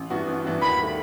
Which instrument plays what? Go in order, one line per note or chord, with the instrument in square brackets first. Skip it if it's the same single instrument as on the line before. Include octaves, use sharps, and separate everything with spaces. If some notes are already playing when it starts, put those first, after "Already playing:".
Already playing: [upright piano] A1
G2 E3 B3 F#4
A1
G2 E3 B3 F#4
[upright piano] D#2 [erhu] B5
[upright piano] D#3 A3